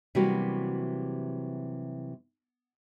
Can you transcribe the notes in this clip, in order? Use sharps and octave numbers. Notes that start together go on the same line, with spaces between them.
C3 E3 F#3 G3 A#3 F#4